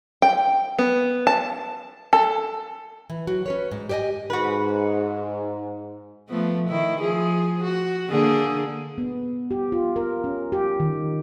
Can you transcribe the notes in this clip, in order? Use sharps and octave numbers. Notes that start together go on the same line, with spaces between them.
G5
B3
A5
A4
E3
F#3 F#4
C#4 B4 C#5
G#2
G4 C5 D5 D#5 G#5
G#2 F#4 B4
F3 A3 B3
D#3 E4
F3 G#4
F#4
D3 A#3 G#4
B3
G4
F4
A#4
C#4
G4
D#3